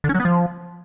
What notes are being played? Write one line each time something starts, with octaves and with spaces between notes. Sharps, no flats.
D3
C#4
F#3
B3
F3